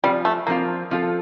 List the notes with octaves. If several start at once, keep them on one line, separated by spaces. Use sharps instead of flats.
F3 G3 C4 F4
A3
F3 A#3 C4 F4
F3 C4 F4 A4